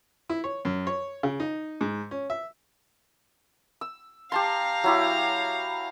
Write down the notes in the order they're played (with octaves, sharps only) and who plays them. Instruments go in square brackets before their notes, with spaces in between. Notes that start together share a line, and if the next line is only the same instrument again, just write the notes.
[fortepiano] E4
C#5
F#2
C#5
C#3
D#4
G#2
C#4
E5
[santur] E6
[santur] G4 A5 C6 [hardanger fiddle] F5 A#5
[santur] F#3 E4 G4